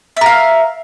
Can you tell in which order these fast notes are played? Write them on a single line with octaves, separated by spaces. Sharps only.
E5 A#4 F5